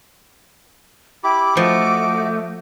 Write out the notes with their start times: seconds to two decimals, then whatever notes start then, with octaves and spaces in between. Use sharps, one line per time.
1.24 E4 G4 B5 D6
1.57 F3 A3 F#4 D#5